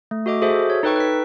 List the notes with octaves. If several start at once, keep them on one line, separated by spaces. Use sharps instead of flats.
A3
F#4 A4 D#5 D6
F#4 G#4 A4 C5 E5
C#5
D#4 A4 B4 G5 C#6
B4 B6